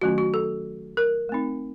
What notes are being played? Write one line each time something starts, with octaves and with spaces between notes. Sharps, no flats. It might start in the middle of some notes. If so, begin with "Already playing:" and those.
D#3 F#3 A3 C#4 F4 F#4
F#4
A4
A#4
A3 C4 D#4